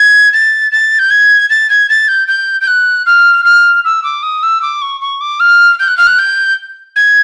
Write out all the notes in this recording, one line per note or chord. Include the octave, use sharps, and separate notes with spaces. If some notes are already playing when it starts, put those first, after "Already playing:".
Already playing: G#6
A6
A6
G6
G#6
A6
G#6
A6
G6
G6
G6
F#6
F6
F6
E6
D6
D#6
E6
D6
C#6
C#6
D6
F6
G6
F#6
F6
F#6
G6
G#6